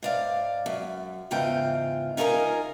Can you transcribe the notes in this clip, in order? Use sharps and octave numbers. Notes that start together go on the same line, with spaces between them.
G#2 D5 F5
F#2
E2 G#2 C#3 F4 G5
C#4 D#4 F4 G#4 A#4 G#5